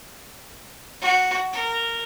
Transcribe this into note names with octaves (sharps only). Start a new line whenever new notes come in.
F#4
A#4